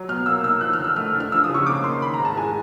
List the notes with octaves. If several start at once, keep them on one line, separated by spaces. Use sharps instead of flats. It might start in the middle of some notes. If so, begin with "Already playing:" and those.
Already playing: F#3
B2 F6
A#3 E6
D#4 E6
F3 F#6
F6
D3 E6
A3 F6
D4
F6
F3 E6
D#6
C#3
C#6
A#3 D6
D#4 C6
D#3 B5
A#5
G#2
A5
G#3 G#5